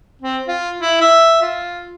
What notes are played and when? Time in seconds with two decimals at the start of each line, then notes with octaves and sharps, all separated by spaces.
0.22 C4
0.47 F4
0.81 E4
1.01 E5
1.42 F4